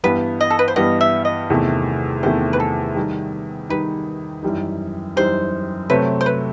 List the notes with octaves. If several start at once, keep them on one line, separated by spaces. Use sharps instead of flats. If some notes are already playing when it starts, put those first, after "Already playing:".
G2 E3 G3 B3 B4
D#5
A4
B4
C5
G2 E3 G3 B3 D#5
E5
D#5
E2 C3 D#3 A3 E4
E2 C3 D#3 A3 E4 C5
B4
A4
D#3 G3 D#4
D#3 G3 D#4 B4
F#2 E3 G3 D#4
F#2 E3 G3 D#4 C5
C3 F#3 A3 C4 B4
C5
B4